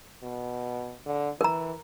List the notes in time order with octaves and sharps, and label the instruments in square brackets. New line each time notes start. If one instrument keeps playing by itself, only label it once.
[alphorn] B2
D3
[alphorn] E3 [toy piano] A#4 A#5